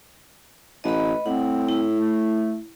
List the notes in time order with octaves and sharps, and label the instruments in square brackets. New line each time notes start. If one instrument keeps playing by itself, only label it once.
[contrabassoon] A1 [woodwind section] A3 B4 [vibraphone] D#5 B5
[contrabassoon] A2 [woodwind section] C4 [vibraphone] F#5
[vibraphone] E4
[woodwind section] A3